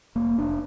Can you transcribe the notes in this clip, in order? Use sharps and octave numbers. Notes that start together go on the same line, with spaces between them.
F1 A#3
F1 D4